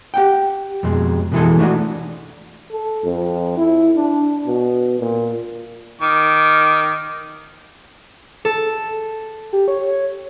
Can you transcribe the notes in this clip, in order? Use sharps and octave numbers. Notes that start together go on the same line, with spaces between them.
G4 F#5 G5
F2 B2 G#3
B2 E3 G#3 G#4 A4
A3 D4 D#4 F4 F#4
A4
F2
E4
D4
B2
A#2
D#3 D6
A4
G4
C#5